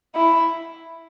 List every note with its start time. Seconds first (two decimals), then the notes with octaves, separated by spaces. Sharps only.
0.15 E4